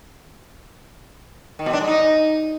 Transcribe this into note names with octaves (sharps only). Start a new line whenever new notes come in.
D#3
B2
D4
G#3
D#4